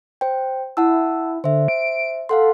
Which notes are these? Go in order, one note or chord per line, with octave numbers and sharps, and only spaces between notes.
C5 G5
E4 F#5 A5 E6
D3 C5 E5
D7
A4 F5 F#5 C6